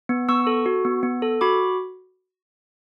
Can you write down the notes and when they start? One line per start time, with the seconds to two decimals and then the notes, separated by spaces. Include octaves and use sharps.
0.09 B3
0.29 B3 C#6 E6
0.47 A4
0.66 F#4
0.85 B3
1.03 B3
1.22 A4
1.41 F#4 B5 D6